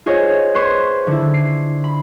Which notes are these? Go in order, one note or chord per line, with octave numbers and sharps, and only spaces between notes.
F4 G#4 C5 C#5 D#5
B4 C5 C6 C#6 G#6 B6
D3 E4
C7
B5